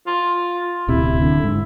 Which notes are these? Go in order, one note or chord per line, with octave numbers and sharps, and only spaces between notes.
F4
D1 C3 E4
D3
G#2